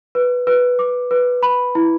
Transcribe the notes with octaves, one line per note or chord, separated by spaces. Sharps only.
B4
B4
D6
B4
B5
E4